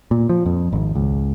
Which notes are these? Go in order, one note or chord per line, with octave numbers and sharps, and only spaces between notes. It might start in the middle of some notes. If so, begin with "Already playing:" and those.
A#2
F3
F2
G#1
C#2